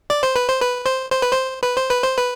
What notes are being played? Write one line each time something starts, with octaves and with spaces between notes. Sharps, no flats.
D5
C5
B4
C5
B4
C5
C5
B4
C5
B4
C5
B4
C5
B4